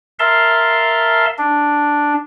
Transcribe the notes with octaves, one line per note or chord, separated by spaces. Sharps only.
A#4 E5 F5 A5 C6
D4